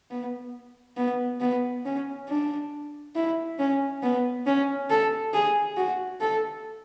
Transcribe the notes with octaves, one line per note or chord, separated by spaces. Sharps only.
B3
B3
B3
C#4
D4
E4
C#4
B3
C#4
A4
G#4
F#4
A4